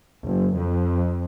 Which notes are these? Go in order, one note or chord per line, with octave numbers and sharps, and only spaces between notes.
F#1
F2